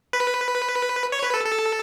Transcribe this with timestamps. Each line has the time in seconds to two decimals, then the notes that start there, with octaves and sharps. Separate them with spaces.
0.13 B4
1.12 C#5
1.23 B4
1.34 A4
1.45 A4